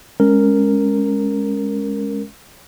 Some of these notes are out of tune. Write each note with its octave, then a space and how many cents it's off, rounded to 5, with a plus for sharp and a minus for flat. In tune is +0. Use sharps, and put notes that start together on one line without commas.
G#3 +0 C#4 -5 A#4 -5